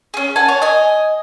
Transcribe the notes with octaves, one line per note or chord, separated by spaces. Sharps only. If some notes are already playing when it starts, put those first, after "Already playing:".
C#4 G#4
F#5 G#5 A5
C#5
D#5 G#5